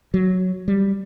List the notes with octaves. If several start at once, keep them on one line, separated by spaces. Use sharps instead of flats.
F#3
G3